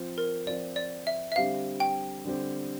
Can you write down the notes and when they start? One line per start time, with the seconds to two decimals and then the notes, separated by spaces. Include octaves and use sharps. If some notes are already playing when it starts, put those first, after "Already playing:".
Already playing: F3 C4 F4 C5
0.18 A#4
0.46 F3 C4 F4 C5 D5
0.76 D5
1.07 E5
1.32 E5
1.36 D3 G3 C4 G4 C5 F5
1.80 G5
2.25 D3 G3 C4 G4 C5